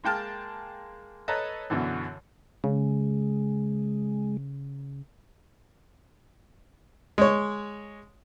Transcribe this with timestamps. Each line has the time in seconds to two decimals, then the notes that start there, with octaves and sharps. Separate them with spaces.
0.04 G#3 A#3 G5 A5 F6
1.28 A4 B4 C#5 D#5 A5 A#5
1.70 F#2 B2 D3 E3
2.64 C#3 G#3
7.18 G#3 C#5